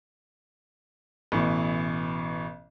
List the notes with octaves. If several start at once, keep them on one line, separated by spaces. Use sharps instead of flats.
A1 B2 E3